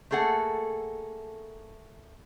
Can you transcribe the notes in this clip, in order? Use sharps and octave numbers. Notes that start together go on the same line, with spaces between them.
A3 A#3 G#4 A4 F#5